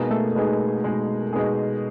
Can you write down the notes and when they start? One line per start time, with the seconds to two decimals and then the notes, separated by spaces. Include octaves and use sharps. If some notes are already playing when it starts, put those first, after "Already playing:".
Already playing: B2 G#3 A#3 B3 D#4 G#4 A#4
0.11 A3 A4
0.35 B2 G#3 B3 D#4 G#4
0.84 B2 G#3 B3 D#4 G#4
1.33 B2 G#3 B3 D#4 G#4